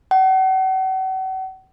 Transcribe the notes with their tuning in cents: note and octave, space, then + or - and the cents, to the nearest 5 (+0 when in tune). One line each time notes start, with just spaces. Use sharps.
F#5 +40